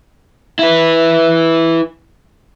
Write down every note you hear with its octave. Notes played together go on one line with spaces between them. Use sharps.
E4 B4